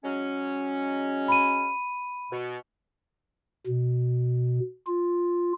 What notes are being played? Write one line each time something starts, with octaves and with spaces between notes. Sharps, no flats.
F#3 G#3 C#4
B5 D#7
B2
B2
F4